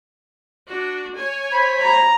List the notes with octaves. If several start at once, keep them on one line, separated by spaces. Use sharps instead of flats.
D4 F#4
C#5 G#5
C5 B5
A#5